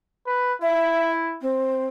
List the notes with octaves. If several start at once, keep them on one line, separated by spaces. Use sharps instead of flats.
B4
E4 E5
C4